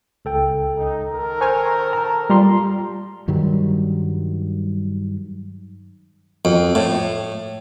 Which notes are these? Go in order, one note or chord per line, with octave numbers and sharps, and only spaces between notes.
C#2 A4 G5
D#4
D#3 A4 A#4
C5 G#5 C#6 F6
A5 A#5
G3 F4 A#5 C6
G2 D#3 F#3 G3
F2
A2